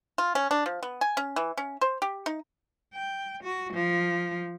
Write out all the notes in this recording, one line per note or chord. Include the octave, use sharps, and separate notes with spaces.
F4
C#4
D4
F3
B3
G#5
C#4
E3
C#4
C5
G4
D#4
G5
F#4
F3